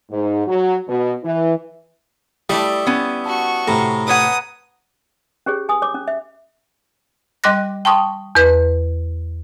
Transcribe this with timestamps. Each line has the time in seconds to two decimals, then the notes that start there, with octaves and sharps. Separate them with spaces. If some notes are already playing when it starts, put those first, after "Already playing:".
0.11 G#2
0.48 F#3
0.88 B2
1.24 E3
2.49 G3 A3 E4 D5 D#6 E6 B6
2.87 B3 C#4
3.26 F#4 A5 C#6
3.68 A2 C3 A#5 B5 A#6
4.08 B4 C#5 F#5 D#6
5.46 C#4 G4 G#4 C#5
5.69 G#5 D#6
5.82 C#5 D6
5.94 C#4
6.08 E5
7.44 G3 D#5 C6 D6 F#6 A#6
7.85 G5 A5 C6 C#6 D#6
8.35 E2 B4